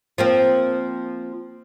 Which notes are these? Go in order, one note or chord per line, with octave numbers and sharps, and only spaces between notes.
F3 A#3 C4